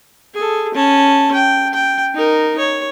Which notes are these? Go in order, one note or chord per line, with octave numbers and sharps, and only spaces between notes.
G#4 A4
C#4 A5
G5
G5
D#4 A#4
C#5